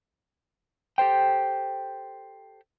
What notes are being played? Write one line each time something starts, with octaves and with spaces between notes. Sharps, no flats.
G4 A4 C5 G5